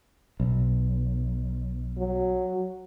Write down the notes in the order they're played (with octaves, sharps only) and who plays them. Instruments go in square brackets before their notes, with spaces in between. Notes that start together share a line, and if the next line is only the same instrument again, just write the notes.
[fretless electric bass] B1
[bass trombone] F#3